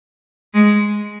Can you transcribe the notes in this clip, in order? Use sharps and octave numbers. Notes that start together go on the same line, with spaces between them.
G#3